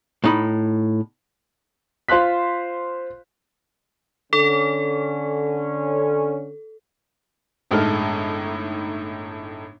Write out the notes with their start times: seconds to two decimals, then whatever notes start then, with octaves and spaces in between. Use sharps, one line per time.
0.24 A2 D#4 B5
2.08 F4 C5 F5 C6 F#6 B6
4.33 D3 C#4 A4
7.71 G1 A2 G#3 D#4 A4 F6